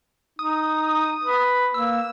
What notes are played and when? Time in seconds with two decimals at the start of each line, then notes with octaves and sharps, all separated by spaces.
0.39 D#4 D#6
1.24 B4
1.74 A#3 E6